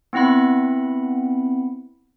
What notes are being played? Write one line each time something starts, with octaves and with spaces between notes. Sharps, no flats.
B3 C4 E4 F#5 B5